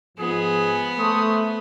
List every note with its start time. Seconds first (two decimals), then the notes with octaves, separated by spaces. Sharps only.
0.18 G#2 F3 B3 G#4
0.98 A3 C5 C#6 D#6